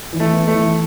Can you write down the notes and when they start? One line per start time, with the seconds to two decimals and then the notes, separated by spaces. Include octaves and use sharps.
0.13 E3
0.20 A3
0.33 B3
0.48 A3
0.54 E3